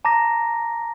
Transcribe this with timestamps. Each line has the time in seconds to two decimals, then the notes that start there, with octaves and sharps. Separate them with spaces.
0.05 A5 A#5 D6 A#6